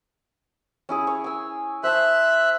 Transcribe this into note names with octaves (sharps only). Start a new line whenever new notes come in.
C#4 E4 G#4
C#5
G#5 E6
C5 E5 A5 F#6